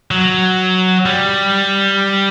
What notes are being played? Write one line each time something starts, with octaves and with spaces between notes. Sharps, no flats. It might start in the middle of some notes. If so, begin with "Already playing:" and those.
F#3
G3